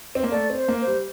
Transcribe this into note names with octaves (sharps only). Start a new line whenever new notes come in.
C4
A#3
A3 D5
C4
C5
A#3
C5
G3